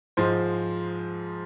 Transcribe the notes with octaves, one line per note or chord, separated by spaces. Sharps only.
G#2 F3 G#3 C5